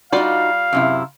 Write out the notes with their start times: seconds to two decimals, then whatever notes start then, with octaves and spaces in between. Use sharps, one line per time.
0.12 G3 D#4 F4 F#4 D5 F5
0.73 F#2 C3 E4